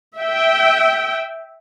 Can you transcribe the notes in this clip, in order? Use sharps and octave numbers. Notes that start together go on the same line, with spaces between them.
E5 G5